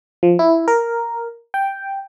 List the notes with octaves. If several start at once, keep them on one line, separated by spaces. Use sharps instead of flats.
F3
E4
A#4
G5